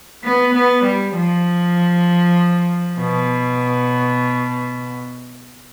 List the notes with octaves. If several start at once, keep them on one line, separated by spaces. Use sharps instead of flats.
B3
B3
G3
F3
B2